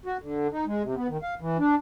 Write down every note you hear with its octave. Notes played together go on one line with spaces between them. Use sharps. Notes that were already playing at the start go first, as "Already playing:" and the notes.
F#4
D3
D#4
G#3
C3
B3
D#3
F5
E3
D4